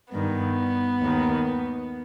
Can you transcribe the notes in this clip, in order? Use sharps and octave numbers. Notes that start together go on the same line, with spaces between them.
G2 D#3 B3
D#2 D#3